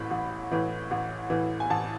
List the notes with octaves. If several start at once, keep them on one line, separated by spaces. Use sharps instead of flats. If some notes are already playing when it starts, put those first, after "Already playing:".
Already playing: A1 A2 E3 B5
A1
A2 E3
A1
A2 E3
G#5
A1 A5